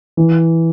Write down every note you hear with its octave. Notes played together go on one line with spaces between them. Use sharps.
E3